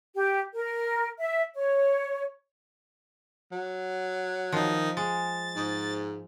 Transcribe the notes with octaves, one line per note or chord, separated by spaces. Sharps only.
G4
A#4
E5
C#5
F#3
D#3 F3 D#4
G#3 A6
G#2